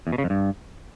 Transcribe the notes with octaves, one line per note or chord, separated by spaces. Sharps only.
E2
B2
C#3
F2
G2